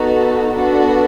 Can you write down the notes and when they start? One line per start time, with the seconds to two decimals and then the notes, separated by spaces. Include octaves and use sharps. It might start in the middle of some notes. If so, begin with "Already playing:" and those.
Already playing: B3 D#4 F#4 A4
0.55 B3 D4 F#4 A4